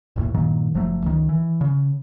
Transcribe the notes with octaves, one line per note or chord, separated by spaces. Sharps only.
F#1 D#2 A2
G2 A#2 D#3 F#3
F#1 F3 F#3 A3
C#2 D#3
E3
C#3